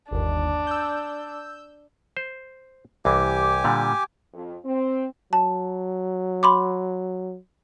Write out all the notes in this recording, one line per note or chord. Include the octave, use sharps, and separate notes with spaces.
G1 D#2 D4
E6 G6
C5
C2 E3 G4 G#5 D6
A#2 D3 G3
F2
C4
F#3 A5
B5 C6 D6